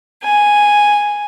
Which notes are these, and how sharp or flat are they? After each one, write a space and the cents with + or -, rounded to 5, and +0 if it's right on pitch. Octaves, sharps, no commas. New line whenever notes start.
G#5 -5